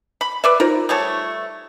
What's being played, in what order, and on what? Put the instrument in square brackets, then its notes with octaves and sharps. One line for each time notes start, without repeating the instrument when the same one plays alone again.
[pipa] B5
B4 D5 E5
[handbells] D#4 F4 C5 [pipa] A#4
[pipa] G3 A3 C#5 [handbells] A5 D#6